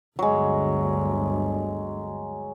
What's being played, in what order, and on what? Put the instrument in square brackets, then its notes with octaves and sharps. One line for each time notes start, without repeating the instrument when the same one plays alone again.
[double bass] G1 D2 [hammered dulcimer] F#3 G#3